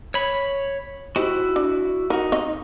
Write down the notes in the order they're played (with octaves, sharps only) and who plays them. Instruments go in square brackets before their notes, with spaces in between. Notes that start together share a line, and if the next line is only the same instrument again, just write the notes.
[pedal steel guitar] C#5 B5
[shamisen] D#4 G4 C5 [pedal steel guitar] E4 F#4
[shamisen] D4
[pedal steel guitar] D#4 [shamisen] F#4 A#4
[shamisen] C4 D#5